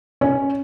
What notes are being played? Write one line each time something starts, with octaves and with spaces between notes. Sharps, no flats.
C#4